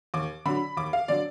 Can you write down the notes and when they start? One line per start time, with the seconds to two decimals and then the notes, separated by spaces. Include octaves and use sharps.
0.14 D#2 D6
0.45 D3 F#3 B5
0.77 D#2 D6
0.93 F5
1.08 D3 F#3 D5